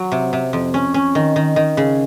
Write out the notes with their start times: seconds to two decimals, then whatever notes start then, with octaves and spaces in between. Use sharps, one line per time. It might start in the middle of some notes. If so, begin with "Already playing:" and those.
Already playing: F#3
0.12 C3
0.33 C3
0.53 F2
0.74 C#4
0.94 C#4
1.15 D#3
1.36 D#3
1.56 D#3
1.77 C#3